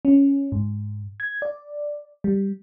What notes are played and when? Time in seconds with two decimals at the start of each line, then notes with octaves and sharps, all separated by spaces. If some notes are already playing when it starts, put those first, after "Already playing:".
0.05 C#4
0.52 G#2
1.20 G#6
1.42 D5
2.24 G3